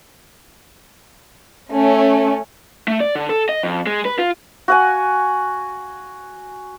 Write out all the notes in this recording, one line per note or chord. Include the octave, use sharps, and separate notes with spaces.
A3 C#4
A3
D5
D3
A4
D#5
F2
G#3
B4
F4
F#4 F#5 G#5